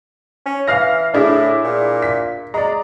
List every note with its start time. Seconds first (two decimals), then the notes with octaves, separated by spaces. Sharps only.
0.46 C#4
0.67 E3 F5 F6 A#6
1.14 A2 D4 E4 G#4
1.63 A#2
2.02 B6
2.54 G#3 D5 A#5